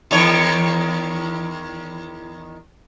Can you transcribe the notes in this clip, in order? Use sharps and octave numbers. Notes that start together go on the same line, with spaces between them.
E2 D#3 C#5